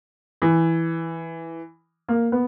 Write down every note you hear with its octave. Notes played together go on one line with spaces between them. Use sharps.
E3
A#3
B3